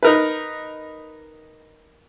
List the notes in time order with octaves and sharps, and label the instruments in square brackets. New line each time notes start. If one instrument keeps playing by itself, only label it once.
[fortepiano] D#4 A#4 B4